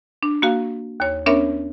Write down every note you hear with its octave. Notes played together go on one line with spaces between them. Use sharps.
D4
A#3 F#4 F5
D#2 C#5
B3 C#4 D4 A#4 C#5 E5